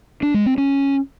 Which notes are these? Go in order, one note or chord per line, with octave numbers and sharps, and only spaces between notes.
D4
G#3
C4
C#4